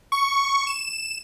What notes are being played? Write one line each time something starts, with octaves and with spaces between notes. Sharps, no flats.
C#6
E7